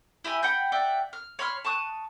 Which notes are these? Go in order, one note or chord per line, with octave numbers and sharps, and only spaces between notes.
E4 G4 G#5 B5
F#5 G5 B5 G6
D5 E5 F#5 G5
F6
C#5 B5 C6 F6
A5 C#6 D#6 F#6